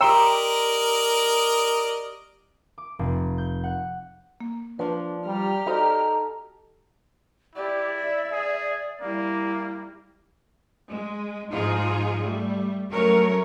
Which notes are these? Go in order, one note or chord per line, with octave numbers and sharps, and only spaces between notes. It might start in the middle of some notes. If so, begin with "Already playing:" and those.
G4 A#4 D5 D#5 G5 A#5 C6 E6
D6
F1
G6
F#5
A#3
F3 D4 B4 A5
G3 G4 A#5 F6
D#4 F#4 A4 C5 D5
E4 G4 D5
E5
G#4
G3 A#3 E4
G#3
G#2 F3 D#4 F4 G#4
G3 A3
F#3 A3 C#4 A#4 C#5